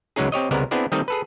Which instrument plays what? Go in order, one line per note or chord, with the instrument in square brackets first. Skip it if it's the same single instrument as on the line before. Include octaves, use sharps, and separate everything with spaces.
[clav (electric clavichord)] C#2 F#3 G#3 C#4 D#4 G#4
C4 G4 C#5 D#5
C#2 C3 G3 G#3 B3 A#4
B3 C4 D4 E4 G#4 D5
D#3 G3 A3 C4 D#4 D#5
G#4 A4 B4